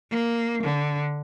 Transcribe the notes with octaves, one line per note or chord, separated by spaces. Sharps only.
A#3
D3